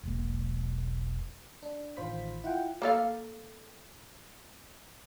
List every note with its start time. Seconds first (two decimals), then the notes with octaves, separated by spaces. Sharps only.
0.03 E1 B1 A#3
1.63 D4
1.97 A1 D#3 F4 C5 B5 B6
2.44 E4 F4 F#5 G5
2.82 A#3 A4 F5